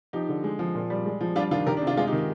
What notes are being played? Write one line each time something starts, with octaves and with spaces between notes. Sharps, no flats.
F3 D#4 G4
D3
G#3
F3
A#2
G3
G#3
F3
G3 D4 F4
D#3 D4 F4
D#3 G4 A#4
D4
C3
D4 F4
G#3 F4 G#4
D#4 G4
D#3
D#4